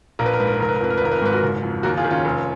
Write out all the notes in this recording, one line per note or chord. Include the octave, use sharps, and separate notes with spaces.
A#1 A#4
B4
A#4
G#2 B4
A#4
B4
F1 A#4
B4
A#4
F2 B4
A#4
B4
G#1 A#4
B4
A#4
G#2 B4
F#4 A#4
F#1
F2
D#2 F#4 A#4
F4 G#4
D#3
C#4 F4
F1